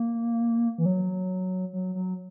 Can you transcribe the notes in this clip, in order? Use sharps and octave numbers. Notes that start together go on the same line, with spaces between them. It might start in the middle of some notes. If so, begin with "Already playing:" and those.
Already playing: A#3
E3
F#3
F#3
F#3